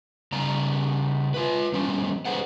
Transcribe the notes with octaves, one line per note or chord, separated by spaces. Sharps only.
C#3 G3 D5 A#5
F4 B4
F3 G3 C4 C#4
G#4 B4 C5 F#5